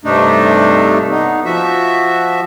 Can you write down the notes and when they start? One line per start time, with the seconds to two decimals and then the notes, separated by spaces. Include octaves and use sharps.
0.05 G2 C3 A3 D4 D#4
1.11 B3 D#4
1.45 F3 F#4 E5